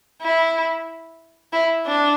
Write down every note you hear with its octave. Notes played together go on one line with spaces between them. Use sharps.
E4
E4
D4